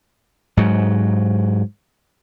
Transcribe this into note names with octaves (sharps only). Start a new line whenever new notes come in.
G#2 F#3